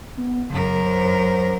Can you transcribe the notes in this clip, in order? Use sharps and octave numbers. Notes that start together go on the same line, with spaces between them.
B3
F#2 C#3 A#4
C5